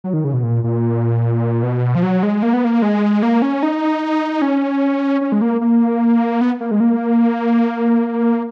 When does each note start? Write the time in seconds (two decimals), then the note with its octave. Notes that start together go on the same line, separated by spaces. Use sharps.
0.04 F#3
0.14 D#3
0.24 C#3
0.34 B2
0.43 A#2
0.64 A#2
1.63 B2
1.95 F3
2.03 F#3
2.23 G#3
2.43 A#3
2.53 B3
2.65 A#3
2.82 G#3
3.23 A#3
3.42 C#4
3.63 D#4
4.42 C#4
5.21 C#4
5.32 G#3
5.42 A#3
5.61 A#3
6.41 B3
6.61 A#3
6.71 G#3
6.80 A#3